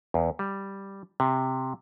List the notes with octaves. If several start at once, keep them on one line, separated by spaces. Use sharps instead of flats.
E2
G3
C3